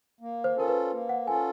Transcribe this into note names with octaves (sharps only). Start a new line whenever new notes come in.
A#3
C5
C#4 F4 A4 A#4
B4
A#3
F#5
C#4 F4 A4 G#5